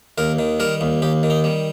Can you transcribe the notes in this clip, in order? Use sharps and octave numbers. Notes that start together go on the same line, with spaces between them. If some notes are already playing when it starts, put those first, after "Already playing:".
D#2 A#4
D#3
G3 A#4
D#2
D#2 G4
D#3
D#4
G3